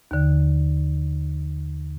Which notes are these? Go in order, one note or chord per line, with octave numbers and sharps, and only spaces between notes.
D#2 D3